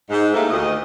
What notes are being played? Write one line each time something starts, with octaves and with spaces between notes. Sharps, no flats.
G#2
A3 A#3 D#4 E4 G4 A4
D2 D#3 D#5